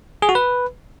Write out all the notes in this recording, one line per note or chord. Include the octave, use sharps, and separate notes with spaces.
G#4
F#4
B4